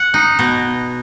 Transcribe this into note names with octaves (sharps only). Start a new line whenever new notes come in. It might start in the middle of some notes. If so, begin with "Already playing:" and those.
Already playing: F#5
D#4
B2